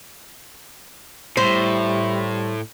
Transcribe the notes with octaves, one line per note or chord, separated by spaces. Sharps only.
A2 G3 E4 C5